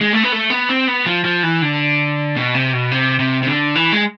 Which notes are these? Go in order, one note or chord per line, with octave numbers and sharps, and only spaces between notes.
G#3
A3
B3
A3
B3
C4
B3
F3
F3
E3
D3
B2
C3
B2
C3
C3
C3
D3
E3
G#3